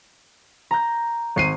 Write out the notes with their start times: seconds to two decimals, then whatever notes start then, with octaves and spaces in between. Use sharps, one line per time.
0.71 A#5 G6
1.36 G#1 C7 D#7